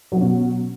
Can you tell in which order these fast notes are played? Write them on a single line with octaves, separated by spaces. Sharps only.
F#3 B2 C#4